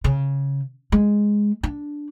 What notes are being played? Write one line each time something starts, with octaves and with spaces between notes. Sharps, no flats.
C#3
G#3
D4